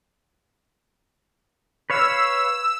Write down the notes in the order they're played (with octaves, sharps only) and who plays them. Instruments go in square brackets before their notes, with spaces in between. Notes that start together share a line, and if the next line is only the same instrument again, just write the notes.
[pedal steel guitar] B4 C#5 F5 [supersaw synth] E6